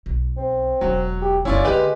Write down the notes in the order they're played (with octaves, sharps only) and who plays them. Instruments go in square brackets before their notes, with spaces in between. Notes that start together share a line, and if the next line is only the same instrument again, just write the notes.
[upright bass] B1
[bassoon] C4
[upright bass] E1 G#3 [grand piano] F#3
[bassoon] G4
[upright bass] F#1 A#3 [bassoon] C#4 [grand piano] E4 F4 D5
[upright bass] D3 A#3 [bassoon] G#3 [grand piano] F4 G4 B4